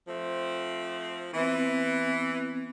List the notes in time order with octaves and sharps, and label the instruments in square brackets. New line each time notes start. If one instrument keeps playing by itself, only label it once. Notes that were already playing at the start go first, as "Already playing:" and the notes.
[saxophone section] F3 A3 C4
[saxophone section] E3 [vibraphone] B3 C4